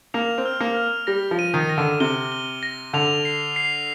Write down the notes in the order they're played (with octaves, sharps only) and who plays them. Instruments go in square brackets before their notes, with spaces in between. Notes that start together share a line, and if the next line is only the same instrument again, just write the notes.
[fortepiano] A#3 [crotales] F7
[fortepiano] C4
[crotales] F6
[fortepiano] A#3
[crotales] F6
[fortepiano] G3 [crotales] A#6
[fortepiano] F3
[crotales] D#7
[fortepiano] D#3
[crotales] A#6
[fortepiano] D3
[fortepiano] C3 [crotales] G7
[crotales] G7
A#6
[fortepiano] D3 [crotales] F7
[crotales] C7
C7